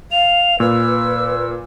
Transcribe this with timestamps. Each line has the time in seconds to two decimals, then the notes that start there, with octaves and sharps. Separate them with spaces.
0.12 F5 F7
0.60 A#2 B4 E6